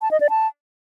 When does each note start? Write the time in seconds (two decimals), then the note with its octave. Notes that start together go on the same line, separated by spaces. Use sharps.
0.02 A5
0.11 D#5
0.21 D5
0.30 A5